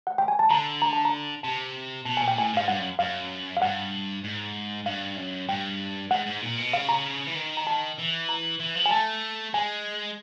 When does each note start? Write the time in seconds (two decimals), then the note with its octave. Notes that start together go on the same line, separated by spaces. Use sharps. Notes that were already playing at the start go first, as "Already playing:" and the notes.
0.07 F#5
0.18 G5
0.28 G#5
0.39 A5
0.50 D3 A#5
0.82 A#5
0.93 A5
1.05 A#5
1.43 C3 A5
2.05 B2 A5
2.17 A#2 G#5
2.28 G5
2.37 A2 G#5
2.53 G#2 F5
2.68 G2 F#5
2.79 F#2
2.99 F#2 F5
3.57 F5
3.62 G2 F#5
4.24 G#2
4.86 G2 F5
5.17 F#2
5.49 G2 G5
6.11 G#2 F#5
6.26 G#2
6.42 A#2
6.58 B2
6.73 C#3 F5
6.89 A#5
7.27 E3
7.35 D#3
7.57 A#5
7.67 A5
7.98 E3
8.29 A#5
8.60 E3
8.76 F3
8.86 G#5
8.91 A3 A5
9.54 G#3 G#5